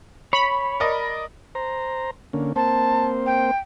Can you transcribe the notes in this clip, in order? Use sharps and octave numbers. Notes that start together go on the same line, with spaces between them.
C#5 B5
A#4 D5 D#5
C5 A#5
D3 A#3 C#4
A#3 C4 C5 A5
G5